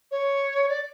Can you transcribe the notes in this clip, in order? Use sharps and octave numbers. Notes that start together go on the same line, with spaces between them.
C#5
D5